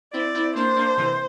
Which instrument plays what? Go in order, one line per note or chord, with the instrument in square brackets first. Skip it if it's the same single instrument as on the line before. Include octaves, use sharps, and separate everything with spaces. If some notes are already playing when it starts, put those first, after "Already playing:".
[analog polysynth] C4 E4 [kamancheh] D5
[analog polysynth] C4 E4
[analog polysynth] A#3 D4 [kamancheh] C5
[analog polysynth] A#3 D4
C3 E3